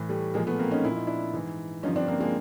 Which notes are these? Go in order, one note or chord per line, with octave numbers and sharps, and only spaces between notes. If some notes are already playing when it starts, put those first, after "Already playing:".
Already playing: A2 E3
G3 A3
A#2 F3 G#3 A#3
A3 B3
A#3 C4
C#4 D#4
A#2 F3 E4
D#4
D4 E4
G#2 E3
G2 D3 F3 C#4 D#4
C4 D4
A#3 C4
G#3 A#3